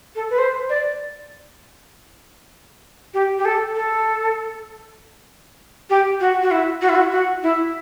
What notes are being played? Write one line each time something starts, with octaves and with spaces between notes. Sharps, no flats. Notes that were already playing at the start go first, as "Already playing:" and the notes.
A4
B4
C5
D5
G4
G4
A4
A4
G4
F#4
F#4
E4
F#4
E4
F#4
F#4
E4